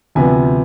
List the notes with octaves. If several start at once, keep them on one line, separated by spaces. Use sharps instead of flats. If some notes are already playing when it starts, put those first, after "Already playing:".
D2 C3 F3 B3 G#5